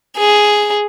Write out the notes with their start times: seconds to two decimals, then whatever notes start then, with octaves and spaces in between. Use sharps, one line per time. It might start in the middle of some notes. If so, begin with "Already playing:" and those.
0.17 G#4